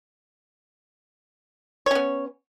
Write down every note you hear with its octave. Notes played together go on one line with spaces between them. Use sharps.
B3 C#4 C#5